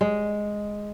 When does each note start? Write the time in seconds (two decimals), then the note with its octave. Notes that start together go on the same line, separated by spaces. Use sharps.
0.01 G#3